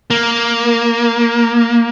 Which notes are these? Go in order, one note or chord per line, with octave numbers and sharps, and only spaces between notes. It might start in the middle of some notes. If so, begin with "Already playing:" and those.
A#3